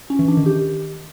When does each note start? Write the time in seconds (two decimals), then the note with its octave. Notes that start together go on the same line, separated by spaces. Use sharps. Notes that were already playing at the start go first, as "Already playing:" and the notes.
0.10 C#4
0.19 E3
0.28 D4
0.37 D#3
0.46 G4